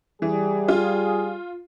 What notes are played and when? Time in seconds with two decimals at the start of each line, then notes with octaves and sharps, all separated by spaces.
0.22 E3 G3 G#4
0.68 F4